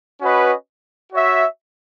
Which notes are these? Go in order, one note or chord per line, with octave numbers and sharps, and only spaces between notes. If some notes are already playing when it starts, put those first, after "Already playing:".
C#4 F#4 B4 D#5
F#4 C#5 E5